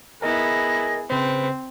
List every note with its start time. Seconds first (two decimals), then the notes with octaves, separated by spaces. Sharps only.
0.22 B3 E4 G#4 A#4 D#5 A#6
1.10 C#3 C4 B4 C5